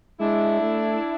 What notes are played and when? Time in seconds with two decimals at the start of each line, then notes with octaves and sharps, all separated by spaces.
0.20 G#3 D4 E4
0.61 A3